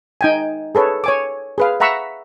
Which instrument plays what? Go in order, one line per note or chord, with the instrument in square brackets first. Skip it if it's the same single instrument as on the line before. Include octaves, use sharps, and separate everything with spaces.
[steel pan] D#4 G5 G#5
G#4 A4 B4 C#5
C#5 G#5 D6
G#4 B4 F5
E5 F#5 A#5 B5 C#6 E6